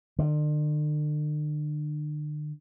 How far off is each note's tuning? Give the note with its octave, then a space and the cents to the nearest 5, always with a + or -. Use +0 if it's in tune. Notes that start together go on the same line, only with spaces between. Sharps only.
D3 +40